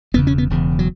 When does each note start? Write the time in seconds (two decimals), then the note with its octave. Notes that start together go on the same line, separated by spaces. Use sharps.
0.14 E1 E2 C#3 B3
0.27 C#4
0.38 B3
0.50 E1 E2 C#3
0.79 F#3